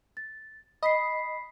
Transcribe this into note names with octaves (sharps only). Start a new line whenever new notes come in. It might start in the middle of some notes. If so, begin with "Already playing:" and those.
A6
D#5 B5 B6 C7